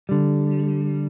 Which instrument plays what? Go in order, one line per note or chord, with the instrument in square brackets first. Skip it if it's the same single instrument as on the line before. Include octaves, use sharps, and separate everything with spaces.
[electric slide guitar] D3 G3